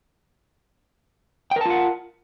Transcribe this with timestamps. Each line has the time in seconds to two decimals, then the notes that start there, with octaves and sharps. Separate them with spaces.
1.51 G5
1.56 A#4
1.61 A5
1.66 F4
1.70 F#5